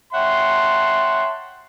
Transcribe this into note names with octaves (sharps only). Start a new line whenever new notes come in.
C#5 E5 F#5 G5 A5 C6